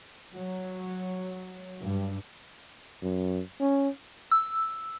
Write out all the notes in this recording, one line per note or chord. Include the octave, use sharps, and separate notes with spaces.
F#3
G2
F#2
C#4
E6